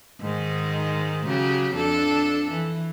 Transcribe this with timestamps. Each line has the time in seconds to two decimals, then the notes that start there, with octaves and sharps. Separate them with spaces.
0.21 G#2 D#3 G#3
1.27 C#3 F#3 G4
1.75 F2 D4 A4
2.51 E3